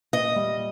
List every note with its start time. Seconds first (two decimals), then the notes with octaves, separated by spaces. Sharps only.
0.13 A#2 D#5
0.36 G3